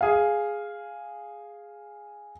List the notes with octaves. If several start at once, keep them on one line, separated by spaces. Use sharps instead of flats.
G#4 F5